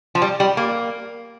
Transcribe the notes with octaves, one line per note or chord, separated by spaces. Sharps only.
F3
G3
G3
A#3